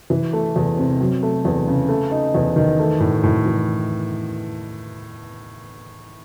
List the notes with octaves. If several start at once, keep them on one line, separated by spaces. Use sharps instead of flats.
E3
A3
E2
C3
F#3
A3
E2
C#3
A3
D#4
E2
D#3
A3
A2
A2
E3